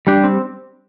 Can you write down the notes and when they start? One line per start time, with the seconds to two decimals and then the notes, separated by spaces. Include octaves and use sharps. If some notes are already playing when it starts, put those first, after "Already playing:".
0.07 G3 D4 G4
0.24 C4